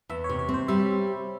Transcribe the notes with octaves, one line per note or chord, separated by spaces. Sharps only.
E2 E5
C#5
C3
C#5
C4
C5
G3 E5